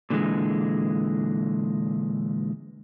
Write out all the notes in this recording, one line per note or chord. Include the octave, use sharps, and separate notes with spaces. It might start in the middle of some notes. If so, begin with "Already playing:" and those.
A#2 D3 E3 G3 G#3